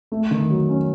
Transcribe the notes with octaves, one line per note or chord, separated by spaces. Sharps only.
A3
D#3
F#3
C#4